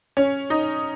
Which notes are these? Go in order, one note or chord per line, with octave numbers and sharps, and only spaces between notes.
C#4
D#4